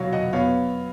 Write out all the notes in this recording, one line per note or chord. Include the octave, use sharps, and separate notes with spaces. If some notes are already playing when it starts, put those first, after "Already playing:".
Already playing: B2 F#3 C#5 F5 F#5
D#5 F#5
B3 C#5 F5